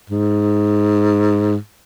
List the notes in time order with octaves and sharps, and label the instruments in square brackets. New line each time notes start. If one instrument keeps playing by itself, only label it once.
[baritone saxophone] G#2